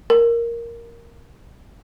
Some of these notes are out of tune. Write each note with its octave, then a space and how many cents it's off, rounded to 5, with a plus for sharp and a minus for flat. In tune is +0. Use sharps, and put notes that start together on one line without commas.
A#4 +0